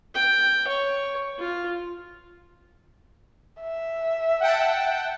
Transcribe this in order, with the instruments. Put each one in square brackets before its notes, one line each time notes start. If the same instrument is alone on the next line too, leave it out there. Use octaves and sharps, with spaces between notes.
[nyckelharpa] G5
C#5
F4
[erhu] E5
[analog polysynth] F#5 G5 A5